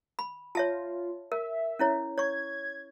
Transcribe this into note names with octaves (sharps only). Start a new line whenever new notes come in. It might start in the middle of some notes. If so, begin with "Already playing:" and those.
B5
F4 C#5 E5 A5
A#4 E5
C#4 E4 C#5
C#5 C#6 G#6